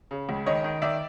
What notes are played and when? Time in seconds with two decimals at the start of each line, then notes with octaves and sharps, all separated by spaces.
0.11 C#3
0.29 C#2
0.46 D#3 C#5 D#5
0.64 D#3
0.82 D#3 D5 E5